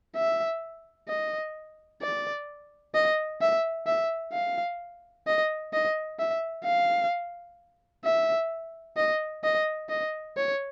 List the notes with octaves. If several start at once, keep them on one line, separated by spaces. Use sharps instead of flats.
E5
D#5
D5
D#5
E5
E5
F5
D#5
D#5
E5
F5
E5
D#5
D#5
D#5
C#5